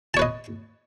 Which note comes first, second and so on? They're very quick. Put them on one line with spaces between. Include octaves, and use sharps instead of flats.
A5 C#5 B4 D#5